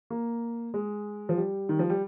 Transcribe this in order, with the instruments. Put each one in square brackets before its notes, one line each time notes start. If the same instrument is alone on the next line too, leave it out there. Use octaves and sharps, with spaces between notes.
[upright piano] A#3
G#3
F3
G3
D#3
F3
G3